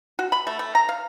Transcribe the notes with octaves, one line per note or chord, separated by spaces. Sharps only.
F#4
B5
A3
A3
A#5
F5